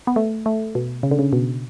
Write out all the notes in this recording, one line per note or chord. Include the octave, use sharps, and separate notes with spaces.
B3
A3
A3
B2
C#3
D3
C#3
B2